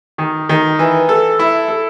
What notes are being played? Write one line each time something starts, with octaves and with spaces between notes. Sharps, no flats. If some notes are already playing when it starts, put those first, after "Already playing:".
D#3
D#3
E3
A4
E4
A4